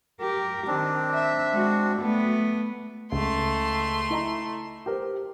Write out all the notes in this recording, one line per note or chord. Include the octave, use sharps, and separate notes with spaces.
G4 A#4
D#3 C4 D4
E5
G#3 F#4
A3 B3
C#2 A3 C6
E4 D#5 A#5
G4 A#4 C5